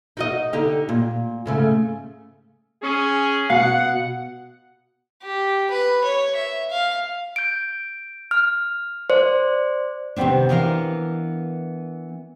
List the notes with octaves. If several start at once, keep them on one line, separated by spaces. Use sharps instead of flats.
D#4 F#4 D#5
D3 D#4 G4
A#2
G#2 C#3 A3
C#4 G#4
B2 F5 F#5
G4
B4
C#5
E5
F5
G6 D7
F6
C5 D5
C3 D#3 E3 B3 C4 D4
E3 B3 D4 A#4 F5